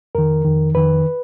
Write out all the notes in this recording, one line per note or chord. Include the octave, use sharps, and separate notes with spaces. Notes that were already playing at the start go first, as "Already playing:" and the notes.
F2 D#3 A#4
F2 D#3
F2 D#3 B4